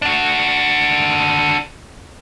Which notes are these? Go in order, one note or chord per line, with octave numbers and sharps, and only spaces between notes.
D4 F#4